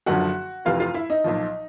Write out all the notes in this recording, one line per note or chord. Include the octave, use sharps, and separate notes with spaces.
F#1 F#2 D3 F3 F#4 F#5
F1 F2 C3 E3 F4 F5
F4 F5
E4 E5
D#4 D#5
B1 A#2 F3